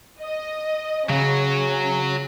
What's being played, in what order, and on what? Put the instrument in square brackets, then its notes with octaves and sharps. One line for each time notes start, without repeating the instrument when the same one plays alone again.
[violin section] D#5
[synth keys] C#3 [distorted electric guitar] F#3 [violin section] C#4